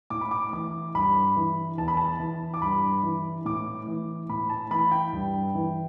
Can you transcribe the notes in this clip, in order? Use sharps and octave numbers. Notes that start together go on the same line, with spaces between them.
A2 D6
B5
D6
E3 D6
G2 B5
E3
E2 A5
B5
A5
E3
D6
G2 B5
E3
A2 D6
E3
A2 B5
A5
E3 B5
G5
G2
E3